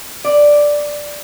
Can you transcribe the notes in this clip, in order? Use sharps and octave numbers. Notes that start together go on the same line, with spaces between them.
D5